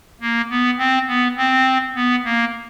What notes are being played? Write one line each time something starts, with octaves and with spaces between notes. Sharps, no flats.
A#3
B3
C4
B3
C4
B3
A#3